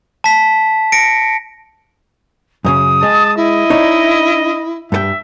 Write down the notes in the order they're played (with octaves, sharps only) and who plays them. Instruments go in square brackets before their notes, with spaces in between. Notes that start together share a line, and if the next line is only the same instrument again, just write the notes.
[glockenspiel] A5 B6
A#6 C#7 D7
[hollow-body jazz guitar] F#2 A2 C#3 [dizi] D#6
[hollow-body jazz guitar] G#3 [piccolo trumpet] A5
[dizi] E4 [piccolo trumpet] D#5
[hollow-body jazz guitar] D4 D#4 C#5
[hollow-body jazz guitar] G2 A4 G5 [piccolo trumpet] E5